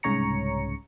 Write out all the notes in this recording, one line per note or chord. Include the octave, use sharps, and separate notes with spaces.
C2 G#2 C#3 C#5 A#5 C#7